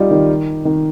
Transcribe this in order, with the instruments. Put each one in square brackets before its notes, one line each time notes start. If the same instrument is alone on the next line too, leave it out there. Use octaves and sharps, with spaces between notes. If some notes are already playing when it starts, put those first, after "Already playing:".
Already playing: [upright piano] G3 D#4 F4 G4
D#3
D#3